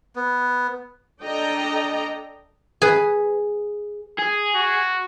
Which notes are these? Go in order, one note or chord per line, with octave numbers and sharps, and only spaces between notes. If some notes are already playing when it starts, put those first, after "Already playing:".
B3
D4 A4 D#5 G5 A#5
G#4 B4
G#4
F#4